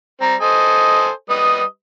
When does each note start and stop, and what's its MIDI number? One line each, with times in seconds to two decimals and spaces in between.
0.21 0.34 55
0.21 0.34 60
0.21 0.35 82
0.41 1.10 69
0.41 1.10 72
0.41 1.09 75
0.41 1.10 80
1.30 1.62 55
1.30 1.62 71
1.30 1.64 75
1.30 1.62 87